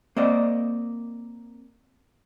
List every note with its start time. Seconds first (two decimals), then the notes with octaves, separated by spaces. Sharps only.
0.17 A#3 C4 D5 D#5